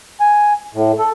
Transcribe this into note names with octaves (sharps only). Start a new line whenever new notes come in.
G#5
A2
A4